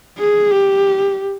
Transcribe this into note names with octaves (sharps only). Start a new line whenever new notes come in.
G#4
G4